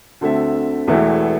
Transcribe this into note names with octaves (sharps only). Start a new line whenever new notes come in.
D2 D3 C4 A4 E5
E1 E2 E3 A3 E4